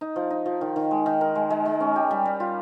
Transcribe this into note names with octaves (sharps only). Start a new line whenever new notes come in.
D#4
F3
D#4
F3
D#3
D#3
G#3
D#3
A#4
G#3
G#3
G#3
C#4
G4
G3
G3
F4